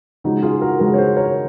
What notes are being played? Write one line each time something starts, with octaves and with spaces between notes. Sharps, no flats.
C#3 F3 G#3 D#4 F#4
F4 G#4
F#4 A#4
C#3 F3 G#3 F#4 A#4
C#5
G#4 C5
A#4 C#5